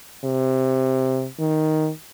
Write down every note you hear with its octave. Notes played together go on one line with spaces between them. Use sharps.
C3
D#3